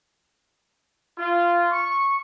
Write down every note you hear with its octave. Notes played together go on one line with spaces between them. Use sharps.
F4
C#6